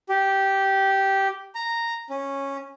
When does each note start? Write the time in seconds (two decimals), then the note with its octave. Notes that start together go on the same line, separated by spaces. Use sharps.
0.09 G4
1.55 A#5
2.10 C#4